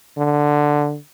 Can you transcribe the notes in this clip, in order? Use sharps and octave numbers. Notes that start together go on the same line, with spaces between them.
D3